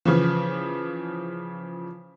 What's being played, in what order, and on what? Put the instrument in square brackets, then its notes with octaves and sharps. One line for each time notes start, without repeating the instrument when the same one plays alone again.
[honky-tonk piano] C#3 E3 F3